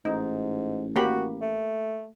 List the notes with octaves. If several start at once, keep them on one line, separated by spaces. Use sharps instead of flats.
A1 G#2 D#4
A#3 F#4 G4 B5
A3